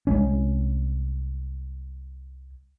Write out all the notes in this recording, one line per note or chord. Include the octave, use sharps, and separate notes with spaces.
C2 G#3 C#4